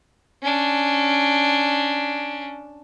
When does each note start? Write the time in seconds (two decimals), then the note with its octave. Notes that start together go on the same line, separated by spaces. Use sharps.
0.43 C#4 D4